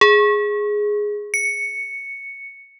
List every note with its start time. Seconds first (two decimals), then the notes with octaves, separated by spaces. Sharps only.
0.01 G#4
1.34 C#7